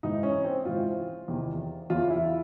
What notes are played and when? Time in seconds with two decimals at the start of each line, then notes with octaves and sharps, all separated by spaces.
0.03 G#2 E3 D#4
0.23 C#4
0.45 C4
0.65 G#2 E3 F4
1.28 E2 C3 D#3
1.89 E2 C#3 E3 F4
2.10 E4